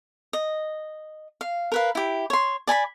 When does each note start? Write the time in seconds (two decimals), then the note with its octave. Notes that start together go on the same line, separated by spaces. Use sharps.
0.33 D#5
1.41 F5
1.72 A#4 B4 F5
1.95 E4 G4
2.30 C#5 C6
2.67 D5 G#5 A#5 B5